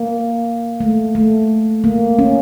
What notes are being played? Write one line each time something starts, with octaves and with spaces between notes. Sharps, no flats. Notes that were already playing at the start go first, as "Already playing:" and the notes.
Already playing: A#3
A3
A3
A#3
C#4